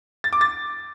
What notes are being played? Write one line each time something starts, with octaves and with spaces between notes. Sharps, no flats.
A6
D6
A6